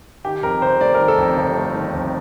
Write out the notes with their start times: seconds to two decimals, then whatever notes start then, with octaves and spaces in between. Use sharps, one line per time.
0.25 D#3 G4
0.43 F2 A#4
0.61 G1 C5
0.80 A3 D5
0.94 A#4
1.00 D#3
1.08 A4
1.18 F2
1.36 G1
1.56 A3
1.75 D#3
1.93 F2